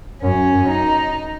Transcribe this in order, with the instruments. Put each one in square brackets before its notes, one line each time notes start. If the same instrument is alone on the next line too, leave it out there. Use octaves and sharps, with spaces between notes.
[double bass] F#2 [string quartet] C#4
[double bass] F#2
[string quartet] D#4